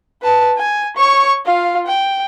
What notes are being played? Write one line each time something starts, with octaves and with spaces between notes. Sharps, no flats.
B4 A5
G#5
C#5 C#6
F4 F5
G5